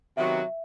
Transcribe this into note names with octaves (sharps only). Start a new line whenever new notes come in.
C3 D#3 F#3 B3 F#4 E5